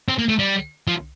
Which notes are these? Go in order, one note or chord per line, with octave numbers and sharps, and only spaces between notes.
C4
A#3
A3
G3
F3